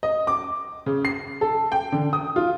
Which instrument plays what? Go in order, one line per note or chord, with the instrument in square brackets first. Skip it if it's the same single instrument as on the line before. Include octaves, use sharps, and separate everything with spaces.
[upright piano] D#5
D6
C#3
C7
A4
G5
D3
D#6
F4